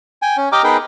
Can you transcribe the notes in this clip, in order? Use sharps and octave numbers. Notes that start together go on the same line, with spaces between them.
G5 G#5
C#4
G4 D#5 G5 A#5 D6 F6
B3 D#4 G#4 A#4 B4 G5